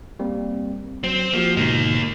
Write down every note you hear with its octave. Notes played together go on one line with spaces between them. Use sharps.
G3 A#3 C4
F#3 C4
F3 A#3 F#4 G4
G#2 B2 D3 A#3 D#4